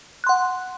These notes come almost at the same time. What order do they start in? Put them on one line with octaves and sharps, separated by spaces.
F#6 C6 F#5